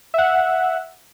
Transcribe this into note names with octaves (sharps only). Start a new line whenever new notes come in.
E5 F#5